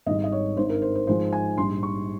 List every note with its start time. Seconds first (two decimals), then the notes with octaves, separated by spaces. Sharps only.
0.06 G#1 G#2 G3 D#5
0.24 D#5
0.32 C#5
0.57 G#1 G2 D#3 C5
0.70 A#4
0.82 C5
0.95 C5
1.07 G#2 F3 G#3 C5
1.33 G#5
1.57 A#1 G#2 G3 C6
1.83 C#6